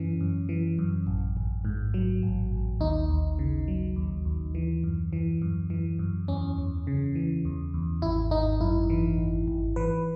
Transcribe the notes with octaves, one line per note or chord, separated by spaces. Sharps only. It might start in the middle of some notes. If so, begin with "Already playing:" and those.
Already playing: F#2 E3 C#4
F#2
E3
F#2
A1
A1
G#2
F#3
A1
A1
D#2 D#4
D#2
C#3
F#3
D#2
D#2
E3
F#2
E3
F#2
E3
F#2
E2 C#4
E2
C#3
E3
E2
E2
G#1 E4
G#1 D#4
F#2 E4
E3
G#1
G#1
E3 B4